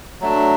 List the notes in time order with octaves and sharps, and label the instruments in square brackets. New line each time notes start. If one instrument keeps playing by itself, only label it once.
[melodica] F#3 A3 D4